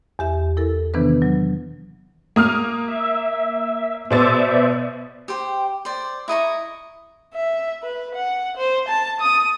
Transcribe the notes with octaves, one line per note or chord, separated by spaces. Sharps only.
E2 G4 E5
E4 A4 A#4
C3 D#3 E3 B3 D4 B4
F#3
A#3 D#6 F6
E5
B2 B3 C5 D5 E5 A6
G4 C5 G5
C5 D5
E4 D#5 A#5 C#6
E5
B4
F#5
C5
A5
D#6